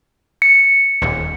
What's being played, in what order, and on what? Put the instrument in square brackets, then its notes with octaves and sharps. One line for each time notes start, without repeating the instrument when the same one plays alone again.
[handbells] C#7
[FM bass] D#1